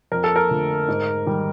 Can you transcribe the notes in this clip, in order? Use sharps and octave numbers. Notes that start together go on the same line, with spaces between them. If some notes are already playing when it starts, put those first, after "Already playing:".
F2 A#4
A4
A#4
D3 F3 A3
G#2
D#3 G3